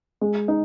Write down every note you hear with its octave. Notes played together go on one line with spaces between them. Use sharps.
G#3
D#4